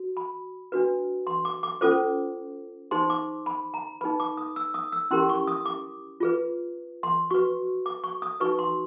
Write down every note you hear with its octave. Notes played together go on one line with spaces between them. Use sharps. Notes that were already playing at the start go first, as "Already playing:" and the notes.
Already playing: F#4
B5
D4 F#4 B4
C6
D6
D6
C#4 F4 A4 C5 D6
D#4 G#4 C5 C6
D6
B5
A#5
D#4 G#4 B4 B5
D6
D#6
E6
D#6
E6
C#4 E4 G4 A#4 C6
C#6
D#6
D6
F4 G#4 B4
C6
F#4 B4 C#6
D6
C#6
D#6
D#4 F#4 B4 C#6
C6